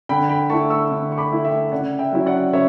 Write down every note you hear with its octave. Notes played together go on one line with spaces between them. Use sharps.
D3 G5 B5
G5 B5
A3 E4 A5 C#6
C#6 E6
D3
C#6
B5 D6
A3 E4
E5 G5
C#3 D5 F#5
E5 G5
F#3 C#4 E4
D5 F#5
C#3 C#5 E5